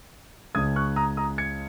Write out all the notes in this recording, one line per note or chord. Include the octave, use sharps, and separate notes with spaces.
C#2 C#3 G#3 D#6 G#6
C#6 F#6
A#5 D#6
A#5 D#6
G#6 C#7